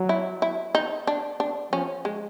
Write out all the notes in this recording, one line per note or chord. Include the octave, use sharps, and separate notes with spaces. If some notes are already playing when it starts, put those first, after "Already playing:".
Already playing: F#3
E4
E4
D#4
D4
D4
F3 C#4
G#3